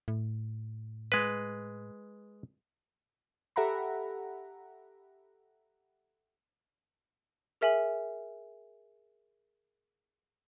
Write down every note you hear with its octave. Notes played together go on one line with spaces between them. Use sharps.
A2
G#3 B4
G4 A4 E5 F#5 A#5 B5
G#4 A#4 E5 G#5 F#7